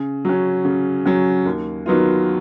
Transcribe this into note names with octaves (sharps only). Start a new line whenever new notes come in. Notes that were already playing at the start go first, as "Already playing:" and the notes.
Already playing: C#3
F#3 C#4
C#3
F#3 C#4
D#2
D#3 F#3 B3 F4